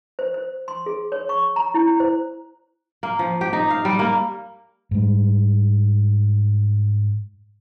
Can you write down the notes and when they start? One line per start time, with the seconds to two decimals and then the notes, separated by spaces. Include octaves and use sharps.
0.19 C5
0.34 C5
0.68 C6
0.86 G#4
1.12 C#5
1.29 C#6
1.56 A#5
1.74 E4
2.00 C5
3.03 A#3
3.19 F3
3.41 G4
3.53 D#4
3.70 F5
3.85 G3
3.99 A#3
4.91 G#2 G3